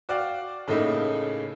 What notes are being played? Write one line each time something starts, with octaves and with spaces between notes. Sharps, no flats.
F#4 D5 F5 G5
A2 C#3 A3 A#3 D#4 E4